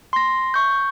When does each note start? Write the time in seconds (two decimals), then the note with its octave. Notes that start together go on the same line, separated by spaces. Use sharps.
0.13 C6 A#6
0.54 C#6 G6